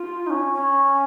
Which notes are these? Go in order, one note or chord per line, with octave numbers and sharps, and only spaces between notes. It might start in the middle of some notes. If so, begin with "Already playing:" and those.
Already playing: F4
D#4
C#4
C#4